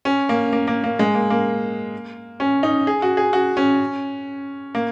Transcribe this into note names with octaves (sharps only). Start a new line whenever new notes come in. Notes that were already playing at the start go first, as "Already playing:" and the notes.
C#4
A#3
A#3
A#3
A#3
G#3
A#3
A#3
C#4
D#4
G#4
F#4
G#4
F#4
C#4
A#3